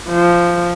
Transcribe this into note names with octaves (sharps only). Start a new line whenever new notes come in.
F3